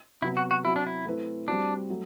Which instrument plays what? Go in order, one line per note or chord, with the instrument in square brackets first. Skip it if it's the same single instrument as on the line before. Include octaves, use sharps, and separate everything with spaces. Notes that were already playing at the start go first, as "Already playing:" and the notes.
[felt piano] C3 F#3 B3 [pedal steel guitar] E4
[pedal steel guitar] F#4
F#4
[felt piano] F#3 C4 F#4 [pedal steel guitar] E4
[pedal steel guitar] D4
E4
[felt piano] A3 C4 E4 B4
[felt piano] G3 C4 F#4 [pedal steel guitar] D4
[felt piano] F#3 A3